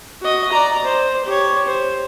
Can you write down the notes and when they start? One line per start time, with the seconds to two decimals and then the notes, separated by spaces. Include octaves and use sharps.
0.21 F#4 D#5
0.52 D5 A#5
0.85 C5
1.26 G4 C#5
1.66 C5